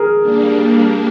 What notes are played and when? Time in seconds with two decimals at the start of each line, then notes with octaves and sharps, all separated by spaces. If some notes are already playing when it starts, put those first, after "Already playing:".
Already playing: G#4 A#4
0.21 G3 A#3 D4